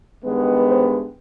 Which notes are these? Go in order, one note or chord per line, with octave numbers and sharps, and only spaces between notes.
G2 D#3 G#3 B3
C5